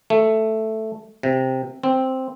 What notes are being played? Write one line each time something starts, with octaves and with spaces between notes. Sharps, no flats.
A3
C3
C4